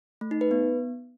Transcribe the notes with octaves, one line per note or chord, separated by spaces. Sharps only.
A3
D#4
B4
B3